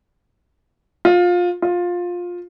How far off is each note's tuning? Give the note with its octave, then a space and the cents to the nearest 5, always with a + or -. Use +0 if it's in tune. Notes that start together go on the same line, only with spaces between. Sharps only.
F4 +20
F4 +15